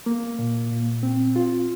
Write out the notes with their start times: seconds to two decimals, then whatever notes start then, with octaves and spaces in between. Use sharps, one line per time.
0.06 A#3
0.39 A#2
0.71 A#2
1.03 C4
1.36 F4